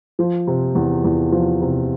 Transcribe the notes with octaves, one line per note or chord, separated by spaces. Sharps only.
F3
C3
E2
E2
F3
C3